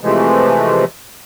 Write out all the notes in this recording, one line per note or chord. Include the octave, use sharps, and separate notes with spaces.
C3 E3 F3 G#3 A3